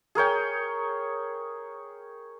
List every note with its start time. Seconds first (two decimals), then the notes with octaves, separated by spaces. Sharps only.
0.15 G#4 A#4 C#5 G5